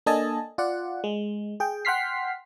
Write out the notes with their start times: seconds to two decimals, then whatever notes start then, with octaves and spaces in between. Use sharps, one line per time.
0.06 A#3 D4 A4 D#5 G#5 A5
0.58 F4 D5 F#5
1.04 G#3
1.60 G#4 G5
1.85 F#5 G5 C6 F6 B6 C7